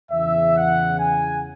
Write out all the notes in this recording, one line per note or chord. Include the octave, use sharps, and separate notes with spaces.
E2 C#3 E3 E5
F#5
G#5